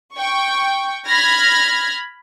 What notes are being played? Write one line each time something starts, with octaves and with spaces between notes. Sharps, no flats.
G5 C#6
B5 F6 G#6 A#6